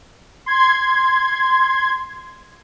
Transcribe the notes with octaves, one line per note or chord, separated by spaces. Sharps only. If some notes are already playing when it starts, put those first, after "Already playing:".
C6 G#6